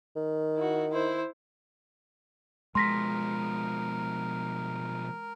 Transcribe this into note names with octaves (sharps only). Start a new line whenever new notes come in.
D#3
E4 F#4
E4 C5
B2 F3 G#3 A#4 C6 A#6 B6